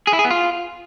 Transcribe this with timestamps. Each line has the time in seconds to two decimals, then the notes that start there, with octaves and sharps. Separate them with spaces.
0.07 G#4
0.13 E4
0.19 G#4
0.25 B3
0.30 F4